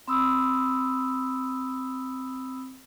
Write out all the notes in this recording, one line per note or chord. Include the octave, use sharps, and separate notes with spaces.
C4 B5 D#6 E6